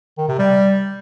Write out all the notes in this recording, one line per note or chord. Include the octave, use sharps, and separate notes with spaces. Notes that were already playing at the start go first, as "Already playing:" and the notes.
D#3
C3
G3